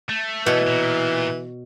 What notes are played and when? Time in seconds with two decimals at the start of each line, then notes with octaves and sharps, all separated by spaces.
0.09 A3
0.46 B2 E3 C#5
0.67 A#2